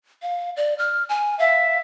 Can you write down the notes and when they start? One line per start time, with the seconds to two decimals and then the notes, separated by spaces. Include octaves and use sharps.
0.22 F5
0.57 D5
0.79 F6
1.09 G#5
1.39 E5 F5